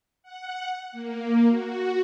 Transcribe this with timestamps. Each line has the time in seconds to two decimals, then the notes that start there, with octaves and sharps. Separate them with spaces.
0.23 F#5
0.92 A#3
1.48 F#4